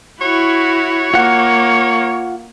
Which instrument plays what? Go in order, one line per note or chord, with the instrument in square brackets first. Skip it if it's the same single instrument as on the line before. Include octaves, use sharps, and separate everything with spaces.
[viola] E4 F#4 [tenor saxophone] C#5
[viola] A#3 [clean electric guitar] F4 F#5